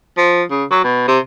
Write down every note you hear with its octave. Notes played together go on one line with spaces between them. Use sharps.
F3
C#3
F#3
B2
C3